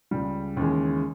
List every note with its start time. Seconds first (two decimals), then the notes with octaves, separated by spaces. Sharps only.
0.11 C#2 C#3 G3
0.57 D#2 C#3 E3 G#3